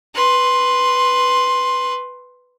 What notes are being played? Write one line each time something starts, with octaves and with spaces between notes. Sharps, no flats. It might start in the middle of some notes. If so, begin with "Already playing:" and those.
B4 C6